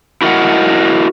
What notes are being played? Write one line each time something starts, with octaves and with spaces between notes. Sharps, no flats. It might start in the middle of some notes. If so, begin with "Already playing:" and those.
E4 F#4 A#4 D5 D#5 F#5